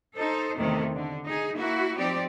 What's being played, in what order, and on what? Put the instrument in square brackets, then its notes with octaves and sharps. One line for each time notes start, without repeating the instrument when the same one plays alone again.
[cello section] D#4 A4 C5
E2 C3 D#3 A3
D3
D#4 G#4
A#3 E4 F#4
F3 C4 D#4 G4 D5